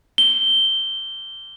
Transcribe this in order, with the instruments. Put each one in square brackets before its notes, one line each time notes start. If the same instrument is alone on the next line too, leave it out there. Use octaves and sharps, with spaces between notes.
[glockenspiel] G7